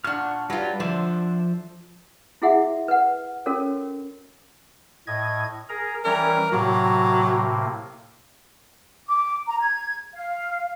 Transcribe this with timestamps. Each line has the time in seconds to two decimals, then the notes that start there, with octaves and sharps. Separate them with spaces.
0.04 A#2 D4 F#5 C#6 F6
0.50 F#3 G3 F4 B4
0.80 D3 F3 D4 C5 E5
2.42 E4 F#4 G#4 E5 F#5
2.88 B4 F#5
3.46 C#4 F#4 A4 A#4 C#5
5.07 A2 D#5 G#6
5.69 G#4 A#4 A#5
6.04 E3 G3 C#4 A#4
6.52 A2 C3 F#3 A#3
9.07 D6
9.47 A#5
9.59 G#6
10.14 F5